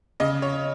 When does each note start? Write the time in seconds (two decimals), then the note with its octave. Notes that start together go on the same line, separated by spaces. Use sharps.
0.20 C#3 D#5
0.42 C#5